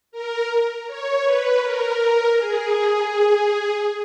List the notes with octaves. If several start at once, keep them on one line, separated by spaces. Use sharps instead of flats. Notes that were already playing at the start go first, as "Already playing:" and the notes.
A#4
C#5
B4
A#4
G#4